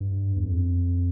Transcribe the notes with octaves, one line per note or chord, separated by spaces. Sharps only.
G2
E2
F2